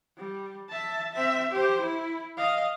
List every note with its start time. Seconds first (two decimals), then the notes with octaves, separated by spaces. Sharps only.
0.18 G3
0.70 E5 A5
1.13 C4 E5
1.51 G4 C5
1.81 E4
2.37 D#5 F5